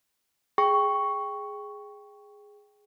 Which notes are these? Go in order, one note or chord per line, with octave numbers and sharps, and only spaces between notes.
G#4 G5 C#6